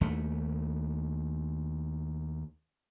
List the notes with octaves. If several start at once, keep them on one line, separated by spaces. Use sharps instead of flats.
D#2 A3